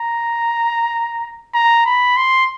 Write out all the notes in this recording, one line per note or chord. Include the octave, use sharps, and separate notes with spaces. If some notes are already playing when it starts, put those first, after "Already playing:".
Already playing: A#5
A#5
B5
C6